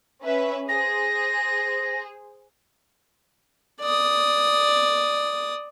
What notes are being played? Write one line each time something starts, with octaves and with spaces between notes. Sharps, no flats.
C#4 B4 E5
G#4 C5 A#6
D5 D#6